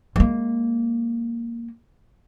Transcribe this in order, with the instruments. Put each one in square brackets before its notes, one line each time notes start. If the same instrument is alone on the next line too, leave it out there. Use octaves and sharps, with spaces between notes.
[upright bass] G#3 A#3